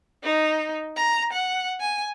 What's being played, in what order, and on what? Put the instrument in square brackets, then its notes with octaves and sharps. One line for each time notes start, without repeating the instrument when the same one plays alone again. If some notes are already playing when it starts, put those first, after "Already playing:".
[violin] D#4
A#5
F#5
G#5